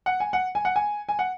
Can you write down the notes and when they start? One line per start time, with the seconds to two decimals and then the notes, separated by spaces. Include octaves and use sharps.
0.06 F#5
0.20 G#5
0.33 F#5
0.55 G#5
0.65 F#5
0.76 G#5
1.09 G#5
1.19 F#5